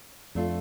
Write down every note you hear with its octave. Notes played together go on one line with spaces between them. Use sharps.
F2 A3 D4 F4 A4